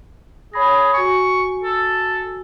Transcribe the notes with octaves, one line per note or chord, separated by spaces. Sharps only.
G#4 C#5 B5 A#6
F#4 G#5 C#6
A4